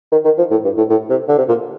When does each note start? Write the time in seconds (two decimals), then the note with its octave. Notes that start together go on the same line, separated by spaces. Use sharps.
0.12 D#3
0.25 D#3
0.38 F3
0.51 A2
0.64 G2
0.77 A2
0.90 A2
1.10 C3
1.29 D3
1.38 C3
1.48 A#2